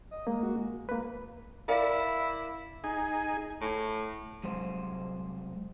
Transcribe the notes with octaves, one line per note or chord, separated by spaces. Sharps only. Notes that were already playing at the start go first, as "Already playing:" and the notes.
D#5
G#3 A#3
F#4
G#3
A#3 B4
E4 A#4 D5 F5
D#4 G#4
A2
C2 F#3 G#3 C5